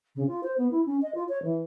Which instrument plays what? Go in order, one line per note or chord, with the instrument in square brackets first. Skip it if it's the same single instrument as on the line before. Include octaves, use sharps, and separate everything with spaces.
[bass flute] C#3
F4
C5
B3
E4
C#4
D#5
F4
C#5
E3